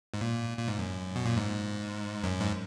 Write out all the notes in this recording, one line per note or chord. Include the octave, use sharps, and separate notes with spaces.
G#2
A#2
A#2
G#2
F#2
B2
A#2
G#2
F#2
G#2